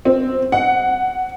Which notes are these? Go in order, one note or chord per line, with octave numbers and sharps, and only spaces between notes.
C4
F#5